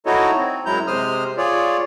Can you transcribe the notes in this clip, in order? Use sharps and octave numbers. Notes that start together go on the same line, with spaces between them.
D#4 E4 F#4 A4 C#5 D#5
C4
F#2 F#3 G#3 E4 A#5 G6
C3 G#3 C5 D#6 F6
F4 G#4 C#5 D5